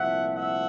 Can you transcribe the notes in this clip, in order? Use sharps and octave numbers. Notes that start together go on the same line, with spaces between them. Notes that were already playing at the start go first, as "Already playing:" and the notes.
Already playing: C2 A#2 F3 A3 E5 F#5
E5 F#5